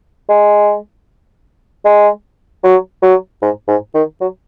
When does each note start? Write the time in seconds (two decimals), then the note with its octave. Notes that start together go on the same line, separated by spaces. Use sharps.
0.29 G#3
1.85 G#3
2.64 F#3
3.02 F#3
3.42 G#2
3.68 G#2
3.94 D#3
4.21 F#3